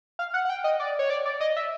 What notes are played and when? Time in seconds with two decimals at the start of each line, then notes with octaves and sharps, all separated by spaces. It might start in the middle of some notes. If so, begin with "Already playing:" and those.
0.19 F5
0.34 F#5
0.45 F#5
0.50 G5
0.64 D#5
0.80 D5
0.99 C#5
1.10 D5
1.25 D5
1.40 D#5
1.56 E5